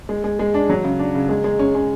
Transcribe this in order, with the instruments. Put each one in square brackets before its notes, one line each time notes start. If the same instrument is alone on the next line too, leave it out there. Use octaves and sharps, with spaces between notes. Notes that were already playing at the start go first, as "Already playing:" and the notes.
[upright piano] G#3
G#3
G#3
D4
F#3
C#3
D4
C#3
G#3
G#3
C#4
C#4